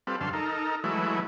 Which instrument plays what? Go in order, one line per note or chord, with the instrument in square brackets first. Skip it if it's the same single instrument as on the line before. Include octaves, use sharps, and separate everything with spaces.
[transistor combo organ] G3 C4 F4 A4 B4
F#2 D3 A4 F5 C6
D#4 A4 A#4
E3 F#3 G#3 A3 E4